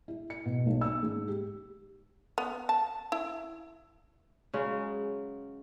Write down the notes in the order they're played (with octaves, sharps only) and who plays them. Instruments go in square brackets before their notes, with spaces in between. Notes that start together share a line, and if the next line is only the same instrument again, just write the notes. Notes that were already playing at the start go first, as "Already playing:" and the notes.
[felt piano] E4
C#7
B2
B1
E6
G#2
G4
[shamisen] B3
A5
E4
[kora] C#3 F#3 G#3 C#4